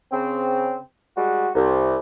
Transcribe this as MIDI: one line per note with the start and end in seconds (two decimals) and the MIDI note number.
0.12 0.77 49
0.12 0.77 60
1.17 1.49 55
1.17 1.49 56
1.17 1.49 66
1.55 1.96 36